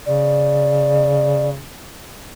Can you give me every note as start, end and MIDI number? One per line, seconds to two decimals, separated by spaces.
0.06 1.61 49
0.06 1.49 74